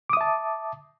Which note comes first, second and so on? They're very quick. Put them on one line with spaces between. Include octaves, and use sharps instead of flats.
D6 D#6 E5 A5